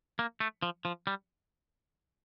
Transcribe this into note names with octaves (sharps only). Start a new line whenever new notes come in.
A#3
A3
F3
F3
G3